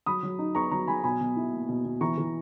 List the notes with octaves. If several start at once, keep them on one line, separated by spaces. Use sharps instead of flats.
F#3 B5 D#6
F#3
D#4
B3 A#5 C#6
F#3 A#5 C#6
F#3 G#5 B5
B2 G#5 B5
B2
E4
A#3
B2
B2
E3 A#5 C#6
E3